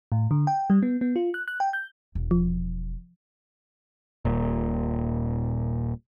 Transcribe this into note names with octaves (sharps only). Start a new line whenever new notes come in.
A2
D3
G5
G3
B3
B3
F4
F#6
F#6
G5
G6
E1
F3
D#1 A#2